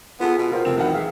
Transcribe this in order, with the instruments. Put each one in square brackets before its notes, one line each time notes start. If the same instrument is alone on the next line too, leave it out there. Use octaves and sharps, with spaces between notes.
[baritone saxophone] B3 [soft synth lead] F4 [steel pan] G#4 A4 B4
[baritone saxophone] B2
[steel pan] F4 C5 G5 [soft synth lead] A#4
[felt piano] F1 C3 E7 [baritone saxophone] C4
[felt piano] B1 E3 F#5 [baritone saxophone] D#3 [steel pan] E4
[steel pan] G#4 E5 F5